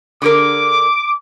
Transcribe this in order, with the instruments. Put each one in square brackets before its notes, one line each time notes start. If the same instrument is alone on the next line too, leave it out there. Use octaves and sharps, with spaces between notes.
[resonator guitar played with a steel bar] D3 G#4 A#4 [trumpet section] D6